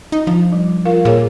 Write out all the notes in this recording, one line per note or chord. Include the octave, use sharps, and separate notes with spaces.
D#4
F3 D4
G3
F4 A#4 F5
A#2 G#4 C#5